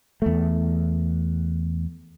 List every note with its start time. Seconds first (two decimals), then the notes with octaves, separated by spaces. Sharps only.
0.22 E2 A3